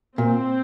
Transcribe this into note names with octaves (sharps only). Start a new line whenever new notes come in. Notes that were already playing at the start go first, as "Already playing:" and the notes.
A#2 C4